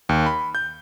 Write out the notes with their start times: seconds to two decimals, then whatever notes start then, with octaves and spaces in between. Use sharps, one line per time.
0.09 D#2
0.26 B5
0.55 G6